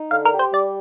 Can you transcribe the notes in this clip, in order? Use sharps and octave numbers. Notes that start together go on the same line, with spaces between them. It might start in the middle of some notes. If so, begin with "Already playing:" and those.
Already playing: D#4
D3 F5
A#4
G4
C5
G3 D5